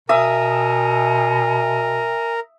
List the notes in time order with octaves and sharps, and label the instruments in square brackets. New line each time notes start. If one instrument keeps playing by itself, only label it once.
[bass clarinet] B2 [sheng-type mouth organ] A#4 [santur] E5 D#6 [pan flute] G#5